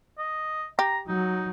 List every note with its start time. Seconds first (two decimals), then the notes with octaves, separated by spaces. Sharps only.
0.18 D#5
0.79 G4 A#5
1.08 F#3 D#4